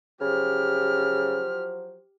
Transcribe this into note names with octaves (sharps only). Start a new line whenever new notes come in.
C#3 F3 F#3 G4 C5 F6